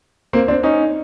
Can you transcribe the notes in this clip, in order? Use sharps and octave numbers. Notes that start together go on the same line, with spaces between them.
A#3 C4
C4 D4
C#4 D#4